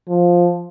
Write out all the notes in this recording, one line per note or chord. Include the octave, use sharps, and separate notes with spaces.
F3